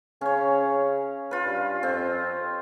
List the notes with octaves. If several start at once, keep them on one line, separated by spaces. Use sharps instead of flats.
C#3 C#4 C#5
F4 B4
G2
F2 C4